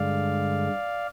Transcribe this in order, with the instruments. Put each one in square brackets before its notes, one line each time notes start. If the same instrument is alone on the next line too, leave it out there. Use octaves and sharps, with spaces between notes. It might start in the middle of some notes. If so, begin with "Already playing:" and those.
Already playing: [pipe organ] G2 D3 G#3 D5 F5